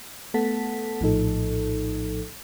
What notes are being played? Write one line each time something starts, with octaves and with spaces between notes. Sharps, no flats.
A3 B3 A4 F#5 A5 B6
A#1 A2 F3 D#4 A4